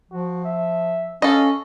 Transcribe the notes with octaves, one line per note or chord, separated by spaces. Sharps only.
F3 F#4
E5
C#4 A4 D#5 F5